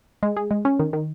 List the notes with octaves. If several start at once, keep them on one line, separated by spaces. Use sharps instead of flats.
G#3
G#4
G#3
C#4
D#3
D#3